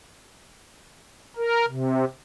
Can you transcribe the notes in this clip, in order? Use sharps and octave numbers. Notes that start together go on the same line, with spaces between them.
A#4
C3